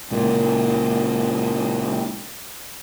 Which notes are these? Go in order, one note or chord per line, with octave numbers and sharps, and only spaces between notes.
C#2 A#2